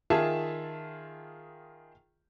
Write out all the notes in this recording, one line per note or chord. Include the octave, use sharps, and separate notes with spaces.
D#3 F4 G#4 E5 A5